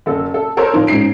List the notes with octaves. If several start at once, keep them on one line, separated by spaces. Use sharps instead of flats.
F#1 A4
A4
A4 A#4 C5 C#5
F3 D#4
G#2 C#4 D#4 C7 D7